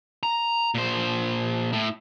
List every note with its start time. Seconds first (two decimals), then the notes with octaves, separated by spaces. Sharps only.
0.23 A#5
0.75 A#2 C5
1.73 A2 E4